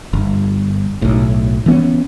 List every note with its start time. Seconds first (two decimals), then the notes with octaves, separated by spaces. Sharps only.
0.13 G1
1.02 B1 A2
1.66 E3 B3 C#4